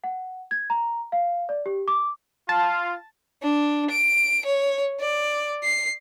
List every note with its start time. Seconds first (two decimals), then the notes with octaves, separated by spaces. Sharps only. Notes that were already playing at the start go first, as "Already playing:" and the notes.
0.04 F#5
0.51 G#6
0.70 A#5
1.12 F5
1.49 D5
1.66 G4
1.88 D6
2.49 F4 F5 A5
3.42 D4
3.90 D7
4.45 C#5
5.00 D5
5.63 C7